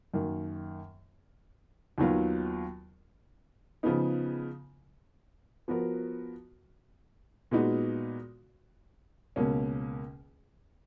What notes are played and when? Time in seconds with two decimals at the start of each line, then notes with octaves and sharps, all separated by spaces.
0.14 F#2 D#3 A#3
1.98 D#2 D#3 F#3 B3 F4
3.83 C#3 F3 B3 D#4
5.68 F3 B3 F#4 A#4
7.51 A#2 G#3 B3 D#4 F#4
9.36 C#2 B2 A#3 C#4